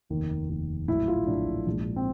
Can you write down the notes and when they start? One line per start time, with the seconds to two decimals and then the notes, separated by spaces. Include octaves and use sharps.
0.09 F1 D#2 D#3
0.48 F1 D#2 D#3
0.88 A#1 A2 F#3 E4
1.08 F4
1.27 A#1 A2 F#3 D4
1.66 A#1 G#2 F3
1.96 C4